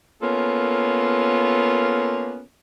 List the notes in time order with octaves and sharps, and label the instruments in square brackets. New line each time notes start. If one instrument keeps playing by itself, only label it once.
[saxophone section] A#3 B3 C#4 F4 A4 A#4